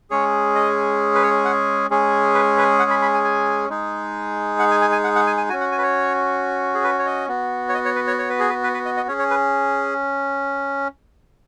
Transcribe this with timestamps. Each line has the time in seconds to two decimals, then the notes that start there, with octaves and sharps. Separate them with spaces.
0.10 G#3 C#4 G#4 C#5
0.55 D#5
1.15 B4
1.23 C#5
1.45 F#5
1.91 G#3 C#4 G#4
2.34 B4
2.57 B4
2.79 F#5
2.90 B5
3.02 B5
3.14 G#5
3.24 G#5
3.69 G#3 D#4 G#4
4.59 F#5
4.71 G#5
4.82 G#5
4.92 G#5
5.04 F#5
5.16 F#5
5.27 G#5
5.37 G#5
5.49 F#4 G#5
5.53 C#4
5.60 F#5
5.72 G#5
5.78 B4
5.83 C#5
6.74 G#4
6.84 B4
6.99 C#5
7.06 D#5
7.28 B3 F#4
7.69 C#5
7.74 D#5
7.85 C#5
7.95 B4
8.07 C#5
8.19 C#5
8.29 B4
8.39 G#4
8.49 B4
8.63 B4
8.74 B4
8.85 D#5
8.97 D#5
9.08 C#4 G#4 C#5
9.19 C#5
9.30 B4